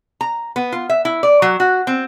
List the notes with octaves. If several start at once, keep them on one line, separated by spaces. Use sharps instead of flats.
A#5
B3
F4
E5
E4
D5
F#3
F#4
C4